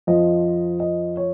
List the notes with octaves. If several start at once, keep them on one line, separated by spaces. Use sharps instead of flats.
F2 F3 D#5
D#5
C#5